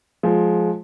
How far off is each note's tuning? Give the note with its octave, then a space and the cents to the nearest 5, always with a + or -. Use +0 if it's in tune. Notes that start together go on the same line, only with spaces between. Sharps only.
F3 +15 G#3 +20